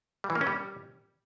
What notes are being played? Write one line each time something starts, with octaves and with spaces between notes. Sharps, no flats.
G3
E3
A#3
C#4
G3